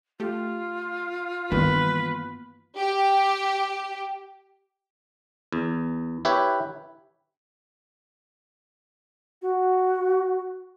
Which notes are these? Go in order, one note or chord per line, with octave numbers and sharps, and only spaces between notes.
A3 F4 G4
G2 D#3 E3 A#3 B3 B4
G4
E2
E4 G4 B4 C#5
F#4